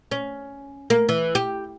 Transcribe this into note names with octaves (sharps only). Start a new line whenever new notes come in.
C#4
A#3
E3
G4